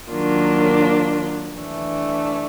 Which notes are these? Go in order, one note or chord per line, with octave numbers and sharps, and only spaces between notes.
D#3 F#3 A#3 D4 F4
E3 A3 D4